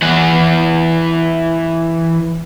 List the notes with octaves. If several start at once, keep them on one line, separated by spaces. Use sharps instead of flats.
E3 F#5